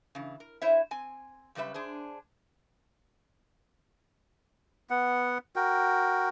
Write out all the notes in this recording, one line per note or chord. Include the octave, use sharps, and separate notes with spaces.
C#3 E3
A#4
E4 C5 C#5 E5
C4 G#5
F#2 C#3 G3 B4 E5
D4 G#4 C5
B3 F#5
F#4 A#4 G5